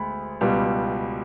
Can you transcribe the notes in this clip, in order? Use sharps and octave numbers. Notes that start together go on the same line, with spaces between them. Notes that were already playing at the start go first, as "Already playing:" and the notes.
Already playing: D2 G#3 B5
C#2 B2 G3